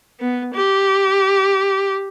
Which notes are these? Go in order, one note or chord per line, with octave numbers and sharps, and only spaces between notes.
B3
G4